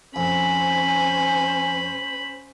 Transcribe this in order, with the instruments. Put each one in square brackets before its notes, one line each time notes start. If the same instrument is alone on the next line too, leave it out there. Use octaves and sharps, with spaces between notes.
[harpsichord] F2 [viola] C#4 C5 [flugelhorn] G#5 [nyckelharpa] B5